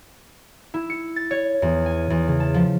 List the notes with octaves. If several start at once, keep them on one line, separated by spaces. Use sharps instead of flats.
E4
C#7
A6
C#5
E2
G#5
E2
C#3
A5
F3